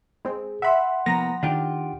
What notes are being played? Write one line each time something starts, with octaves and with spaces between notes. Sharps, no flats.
G#3 C4 G#4
E5 F#5 B5 C6
C2 F3 A#3 B3 A#5 A#6
D#3 D4 F4 G4